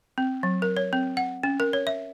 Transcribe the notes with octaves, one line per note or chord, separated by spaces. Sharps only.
C4
F#3
A#4
C#5
C4
F#5
C#4
A#4
C#5
E5